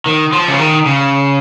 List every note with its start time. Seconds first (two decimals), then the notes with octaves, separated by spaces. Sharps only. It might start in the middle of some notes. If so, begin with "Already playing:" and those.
0.06 D#3
0.33 F3
0.48 C#3
0.59 D#3
0.86 C#3